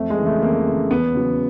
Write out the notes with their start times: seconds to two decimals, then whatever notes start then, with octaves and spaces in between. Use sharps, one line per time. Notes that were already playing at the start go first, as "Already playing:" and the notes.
Already playing: F2 A3
0.10 G#3
0.18 C#3 E3
0.26 A3
0.42 F2 A#3
0.67 C#3 E3
0.91 E2 B3
1.15 C#3 F#3